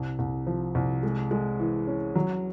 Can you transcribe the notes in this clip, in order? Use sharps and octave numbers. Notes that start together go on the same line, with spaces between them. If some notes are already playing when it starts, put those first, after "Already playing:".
Already playing: C2
C2
F3
C2
G#3
G#3
E3
C#4
F#3